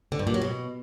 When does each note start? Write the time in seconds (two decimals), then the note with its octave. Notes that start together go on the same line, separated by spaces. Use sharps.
0.12 D3
0.19 G2
0.27 A#2
0.34 F#3
0.42 B2